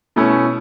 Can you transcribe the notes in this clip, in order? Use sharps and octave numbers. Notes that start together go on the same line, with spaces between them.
B2 A3 C#4 E4